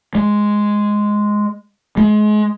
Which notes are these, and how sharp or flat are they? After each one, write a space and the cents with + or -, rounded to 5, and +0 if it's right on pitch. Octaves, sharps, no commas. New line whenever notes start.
G#3 +0
G#3 +30